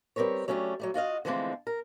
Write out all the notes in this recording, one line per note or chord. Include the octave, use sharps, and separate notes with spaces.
G3 C4 A#4 B4 C#5
F#3 A3 C#4 D4 G4
F#3 G3 A3
F4 F#4 D#5 F5
D3 E3 F3 G#3 A3 C4
A#4